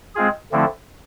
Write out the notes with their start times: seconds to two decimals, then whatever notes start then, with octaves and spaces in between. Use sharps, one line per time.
0.15 G#3 C4 F4 G#4
0.52 D3 F3 A3 C4 E4